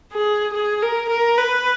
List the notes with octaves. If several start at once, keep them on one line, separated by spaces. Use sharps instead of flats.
G#4
G#4
A#4
A#4
B4